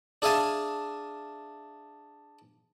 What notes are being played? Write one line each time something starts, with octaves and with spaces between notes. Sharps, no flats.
D4 G#4 E5 F5 G#5 A5